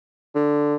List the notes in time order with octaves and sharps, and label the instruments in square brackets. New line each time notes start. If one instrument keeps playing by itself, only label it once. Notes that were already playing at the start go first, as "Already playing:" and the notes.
[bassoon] D3